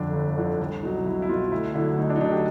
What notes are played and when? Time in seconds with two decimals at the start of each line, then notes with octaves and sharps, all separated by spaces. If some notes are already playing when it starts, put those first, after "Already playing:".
Already playing: G1 F2 D3 F3 D4
0.13 G1
0.36 F2 D3 F3
0.59 C2
0.83 B2 F#3 D#4
1.05 C2 E4
1.22 E4
1.28 B2 F#3 F4
1.51 D2 E4
1.74 D3 F#3 E4
1.98 D2 D#4
2.10 D4
2.16 D#4
2.21 D3 F#3 D4
2.32 G4